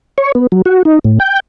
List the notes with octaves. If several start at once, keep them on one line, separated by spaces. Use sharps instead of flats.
C#5
B3
F#3
F#4
D#4
A2
G5